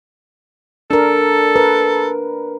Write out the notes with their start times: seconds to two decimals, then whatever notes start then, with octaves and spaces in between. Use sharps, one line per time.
0.91 D4 A4 A#4
1.56 A#4 B4